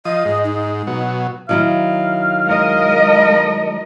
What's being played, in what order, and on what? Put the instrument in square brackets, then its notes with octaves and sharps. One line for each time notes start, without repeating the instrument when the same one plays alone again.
[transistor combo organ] F3 D#6 [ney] D#5
[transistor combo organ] G#2
[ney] D#4
[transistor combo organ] B2 F#3
[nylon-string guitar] D#3 F#3 E4 [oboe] F5
[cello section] G#3 A#4 D#5